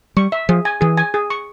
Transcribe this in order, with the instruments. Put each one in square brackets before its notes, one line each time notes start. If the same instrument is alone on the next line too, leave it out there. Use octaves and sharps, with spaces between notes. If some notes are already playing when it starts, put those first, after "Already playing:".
[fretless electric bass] G3 [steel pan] C#6
[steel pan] E5
[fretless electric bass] F3 [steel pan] G#4
[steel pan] G#5
[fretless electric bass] E3 [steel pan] G#4
[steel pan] G#5
G#4
C#6